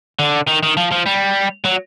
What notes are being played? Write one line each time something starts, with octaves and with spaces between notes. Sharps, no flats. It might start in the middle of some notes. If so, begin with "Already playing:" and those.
D3
D#3
D#3
F3
F3
G3
F#3